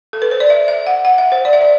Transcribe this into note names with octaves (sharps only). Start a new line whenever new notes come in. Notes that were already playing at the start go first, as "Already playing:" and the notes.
A4
B4
C5
D5
E5
E5
F#5
F#5
E5
C5
D5
E5
D5